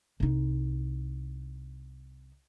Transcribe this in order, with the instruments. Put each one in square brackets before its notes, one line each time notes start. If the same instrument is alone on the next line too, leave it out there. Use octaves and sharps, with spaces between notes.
[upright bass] C2 D#4